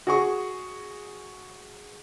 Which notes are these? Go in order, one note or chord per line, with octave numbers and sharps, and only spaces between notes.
F#4 G#4 C#6